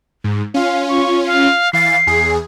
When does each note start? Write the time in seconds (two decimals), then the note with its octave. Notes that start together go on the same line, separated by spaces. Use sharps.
0.24 G#2
0.54 C#4 F4 F5
0.89 C#6
1.26 F5
1.73 E3 F5 A6 C7
2.07 E2 G#4